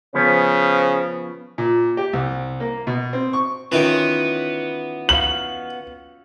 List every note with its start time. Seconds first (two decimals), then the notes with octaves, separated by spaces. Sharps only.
0.14 C#3 F3 B3 C#4 C5
1.58 A#2
1.97 G4
2.13 C2
2.60 A#3
2.87 B2
3.13 C4
3.33 C#6
3.72 D#3 E3 B3 C#4 F4
5.09 F#4 F5 F#7